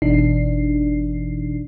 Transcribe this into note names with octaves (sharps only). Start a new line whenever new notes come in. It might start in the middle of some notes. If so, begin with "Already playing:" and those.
G1 B2 E3 D4 D#4 C7